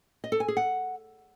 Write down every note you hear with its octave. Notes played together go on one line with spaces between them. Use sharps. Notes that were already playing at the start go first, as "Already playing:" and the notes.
D#5
A4
G#5
G#4
F#5